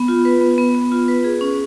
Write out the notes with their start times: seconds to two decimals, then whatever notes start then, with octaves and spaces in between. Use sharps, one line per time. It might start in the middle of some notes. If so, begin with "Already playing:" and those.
Already playing: B3
0.08 F4
0.25 B4
0.41 B3
0.58 B3
0.75 B3
0.92 F4
1.08 B4
1.24 G#4
1.41 C#4